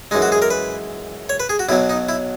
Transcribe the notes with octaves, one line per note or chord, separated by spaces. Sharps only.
F#2 E3 G#3 D#4
F#4
G#4
A#4
B4
C#5
B4
G#4
F#4
B1 B2 F#3 E4
D#4
E4